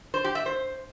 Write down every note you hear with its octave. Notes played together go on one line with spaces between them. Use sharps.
C5
G4
E5
C5